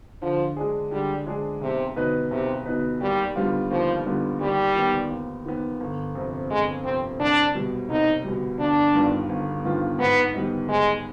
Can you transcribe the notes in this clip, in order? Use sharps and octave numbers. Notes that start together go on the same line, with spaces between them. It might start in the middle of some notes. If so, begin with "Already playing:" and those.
D3 F3
G#3 D4 G#4
D3 G3
G#3 D4 G#4
B1 C3
B2 B3 D#4 B4
B1 C3
B2 B3 D#4 B4
D#2 G3
D3 G3 B3 F4
D#2 F3
D3 G3 B3 F4
D#2 G3
D#3 B3
D#2
D#3 B3
G1
F2 C3
G1 G#3
F2 C3 C4
C2 D4
B2 G3
C2 D#4
B2 G3
G1 D4
G2 D#3 B3 F4
G1
G2 D#3 B3 F4
G#2 B3
D#3 G3 B3 D#4
G#2 G#3